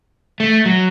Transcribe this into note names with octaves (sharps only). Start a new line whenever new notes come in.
A3
F#3